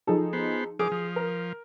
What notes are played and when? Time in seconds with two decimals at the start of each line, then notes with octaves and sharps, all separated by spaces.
0.07 F3 D#4 G#4 A4
0.33 B3 C5
0.79 F3 G#4 D6 D#6
0.92 F3
1.16 A#4